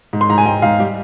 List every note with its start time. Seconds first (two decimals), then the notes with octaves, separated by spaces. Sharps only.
0.13 G#2
0.21 C6
0.29 G#2 A#5
0.38 G#5
0.46 G#2 G5
0.62 G#2 F5
0.79 G3 G4